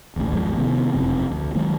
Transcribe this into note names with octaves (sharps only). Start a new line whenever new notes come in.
D#1 A1 D2 A3
G#1 E2 F3 G#3
C3 D#3 B3
F#1 F2 C3 C4
D2
D#3 F#3 G#3 A#3